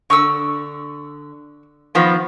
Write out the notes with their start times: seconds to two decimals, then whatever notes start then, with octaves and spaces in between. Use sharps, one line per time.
0.10 D3 C#6 D#6 E6
1.95 D#3 F3 B3